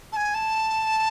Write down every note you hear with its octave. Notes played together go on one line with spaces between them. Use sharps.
A5
G#5
A5